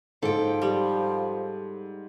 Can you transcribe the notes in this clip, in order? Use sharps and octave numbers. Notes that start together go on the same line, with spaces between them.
G#2 F3 A4 G5
G3